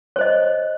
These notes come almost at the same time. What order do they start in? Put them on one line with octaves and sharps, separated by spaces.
C#5 C5 D#5